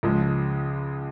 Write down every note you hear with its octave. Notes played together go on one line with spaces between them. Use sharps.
C#2 C#3 F3 G#3